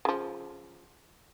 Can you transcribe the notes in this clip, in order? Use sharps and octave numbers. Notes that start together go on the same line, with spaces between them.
C#3 F3